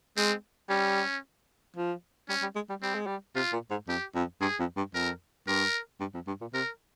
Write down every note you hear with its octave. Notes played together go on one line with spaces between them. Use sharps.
G#3 C4
G3 C#4
F3
G3 C#4
G3
G#3
G3
G3 C4
G#3
G3
C3 F4
A#2
G#2
F2 G4
F2
G2 G#4
F2
G2
F2 A#4
G2 A#4
G2
F2
G2
A#2
C3 A#4